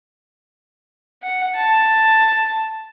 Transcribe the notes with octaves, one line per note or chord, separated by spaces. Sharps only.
F#5
A5